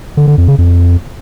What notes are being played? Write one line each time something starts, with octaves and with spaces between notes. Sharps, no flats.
D3
D3
F2
C#3
F2